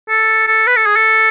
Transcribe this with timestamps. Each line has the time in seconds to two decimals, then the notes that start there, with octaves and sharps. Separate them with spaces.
0.10 A4
0.48 A4
0.67 B4
0.77 A4
0.86 G#4
0.96 A4